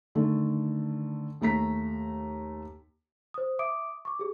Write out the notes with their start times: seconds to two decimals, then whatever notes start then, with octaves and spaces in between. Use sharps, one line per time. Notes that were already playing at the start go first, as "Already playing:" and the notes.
0.15 D3 D#3 A3
1.41 D#2 A3 A#5 B6
3.34 C5 D#6
3.59 E5 D6 D#6 D7
4.05 C#6 D6
4.19 G4 G#4